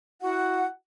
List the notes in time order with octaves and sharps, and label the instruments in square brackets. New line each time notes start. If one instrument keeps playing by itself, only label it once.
[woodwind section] E4 F#4 F#5